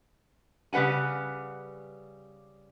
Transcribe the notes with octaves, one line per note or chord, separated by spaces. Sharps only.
C#3 G3 B4 F#5 G#5